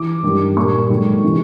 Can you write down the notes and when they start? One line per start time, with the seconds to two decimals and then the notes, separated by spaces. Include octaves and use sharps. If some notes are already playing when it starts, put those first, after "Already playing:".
Already playing: E3 D6
0.23 G2 D#3 G3 A#3
0.56 A#2 G3 A#3 C#6
0.89 G#2 D#3 F#3 A3
1.24 C3 E3 G#3